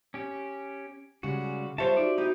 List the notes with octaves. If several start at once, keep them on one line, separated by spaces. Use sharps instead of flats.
C#4 G4
C#3 G3 G#3 F#4
G3 F4 G4 C5 C#5 E5 A5
D#4 F#4 D5
D#4 E4 F#4 G4 G6